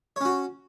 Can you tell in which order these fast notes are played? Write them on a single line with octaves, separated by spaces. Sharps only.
C#5 C#4 F#4